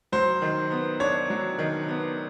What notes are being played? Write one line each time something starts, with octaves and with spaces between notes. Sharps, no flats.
F#3 C5
D#3
B3
D4 C#5
F#3
D#3
B3